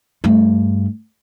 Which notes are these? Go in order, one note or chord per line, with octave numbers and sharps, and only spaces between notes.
G2 A3